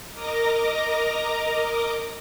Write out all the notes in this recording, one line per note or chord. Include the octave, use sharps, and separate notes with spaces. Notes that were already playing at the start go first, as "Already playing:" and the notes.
A#4 D#5 A#5 D6 A#6